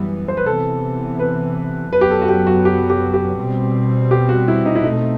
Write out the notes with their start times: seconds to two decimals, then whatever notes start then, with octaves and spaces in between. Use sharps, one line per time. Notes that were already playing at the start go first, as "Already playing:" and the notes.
Already playing: F#2 E3 G3 B3
0.28 C5
0.37 B4
0.46 C3 E3 B3 A4
1.20 B4
1.92 F#2 F#3 B3 B4
2.01 G4
2.11 A4
2.22 F#4
2.29 G4
2.47 F#4
2.65 G4
2.90 G4
3.14 G4
3.39 B2 G3 C4
4.11 G4
4.29 F#4
4.48 E4
4.66 D#4
4.76 E4
4.84 B2 A3 C4 D#4